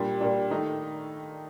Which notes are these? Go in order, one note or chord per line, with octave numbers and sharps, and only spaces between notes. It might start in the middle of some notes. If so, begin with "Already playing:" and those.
Already playing: A#2 G3 D4
A#2 G3 D4
D#3 A3 D#4